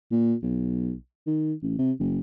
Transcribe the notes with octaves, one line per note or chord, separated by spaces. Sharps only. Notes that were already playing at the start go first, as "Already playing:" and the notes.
A#2
B1
D#3
A1
C3
F#1